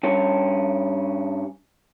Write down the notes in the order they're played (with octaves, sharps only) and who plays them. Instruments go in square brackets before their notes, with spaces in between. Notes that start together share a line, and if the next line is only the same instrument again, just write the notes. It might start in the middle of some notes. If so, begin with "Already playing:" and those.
[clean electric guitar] G2 C#4